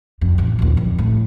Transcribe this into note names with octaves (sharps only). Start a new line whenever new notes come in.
F2
A1
A#1 D#2
F2
A2